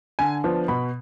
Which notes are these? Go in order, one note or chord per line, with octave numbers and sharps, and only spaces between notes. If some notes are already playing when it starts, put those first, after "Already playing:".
D3 G#5
F3 B3 D4
B2 B5